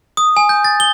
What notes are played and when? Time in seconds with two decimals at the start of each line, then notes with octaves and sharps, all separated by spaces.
0.17 D#6
0.37 G#5
0.49 G6
0.64 A6
0.80 G7